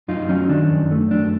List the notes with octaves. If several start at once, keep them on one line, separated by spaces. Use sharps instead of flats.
F#2 D#4 F4
F#3 C#4 D#4
D#3 D4
F#2
A3
F#2 D4